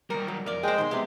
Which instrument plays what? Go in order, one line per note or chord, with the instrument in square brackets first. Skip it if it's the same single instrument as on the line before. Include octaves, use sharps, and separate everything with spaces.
[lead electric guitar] D#3 G3 [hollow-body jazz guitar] A#4
[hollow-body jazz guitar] F#3
[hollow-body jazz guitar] F2 D5 [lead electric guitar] A#4
[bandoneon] G#3 G5 [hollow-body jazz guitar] G#4 C5
[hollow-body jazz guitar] B2 D#3 [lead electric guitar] C6
[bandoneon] C3 [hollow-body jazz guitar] G#3 B3